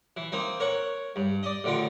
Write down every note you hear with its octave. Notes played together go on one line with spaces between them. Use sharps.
E3
A#3 C4 D#4
A#4 C#5 F#5
G2
D5 D#5
A1 D3 D#3 F4 A#5